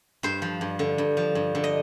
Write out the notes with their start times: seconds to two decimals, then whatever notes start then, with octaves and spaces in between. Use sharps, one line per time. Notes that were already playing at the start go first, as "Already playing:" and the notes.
0.23 G2 C5
0.42 F3
0.61 G2
0.79 D3
0.98 G2
1.17 F3
1.35 G2
1.55 D3
1.64 D#5